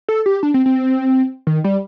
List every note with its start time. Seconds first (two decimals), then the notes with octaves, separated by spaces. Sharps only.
0.09 A4
0.26 G4
0.43 D4
0.54 C4
0.66 C4
1.47 D#3
1.64 G3